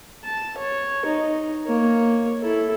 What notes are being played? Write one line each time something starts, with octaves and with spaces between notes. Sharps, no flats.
A5
C#5
D#4
A#3 C#5
E4 A4